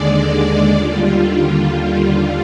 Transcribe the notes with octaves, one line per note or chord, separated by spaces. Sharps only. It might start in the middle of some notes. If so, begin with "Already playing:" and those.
Already playing: D#2 D3 G#3 D5
D#2 D3 G3 F4